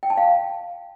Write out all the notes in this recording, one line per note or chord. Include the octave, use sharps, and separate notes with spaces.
G5
A5
F5